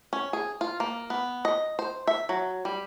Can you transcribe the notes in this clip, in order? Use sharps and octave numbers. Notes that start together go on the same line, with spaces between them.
C#4
G#4
F4
A#3
B3
D#5
C5
E5
F#3
G3